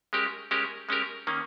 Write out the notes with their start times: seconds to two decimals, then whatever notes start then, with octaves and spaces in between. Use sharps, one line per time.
0.13 G#3 C#4 G4 A#4
0.51 G#3 C#4 G4 A#4
0.89 G#3 C#4 G4 A#4
1.27 D#3 A#3 C#4